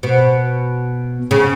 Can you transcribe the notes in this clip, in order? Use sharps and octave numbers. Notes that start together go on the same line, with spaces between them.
B2
C#3